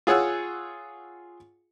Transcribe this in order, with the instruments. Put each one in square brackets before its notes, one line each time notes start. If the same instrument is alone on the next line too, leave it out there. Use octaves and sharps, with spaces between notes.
[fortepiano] F4 G#4 C#5 F#5 E6